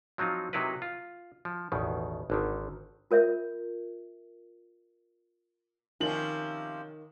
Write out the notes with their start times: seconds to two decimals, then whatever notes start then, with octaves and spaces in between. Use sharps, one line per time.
0.18 F3 F#3 C4 D#4 F4
0.53 C3 F#3 D#4 E4 A#4 B4
0.82 F4
1.45 F3
1.72 A1 E2 B2 D#3
2.30 G#1 D3 D#3
3.11 F4 A#4 C#5 E5
6.00 C3 D#3 F3 C#4 F#7